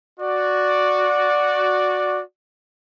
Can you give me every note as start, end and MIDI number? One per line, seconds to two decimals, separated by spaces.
0.20 2.22 66
0.20 2.22 74